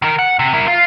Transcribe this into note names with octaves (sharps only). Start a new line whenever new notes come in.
D#3 A#4
F#5
C3
E4 A#4
F4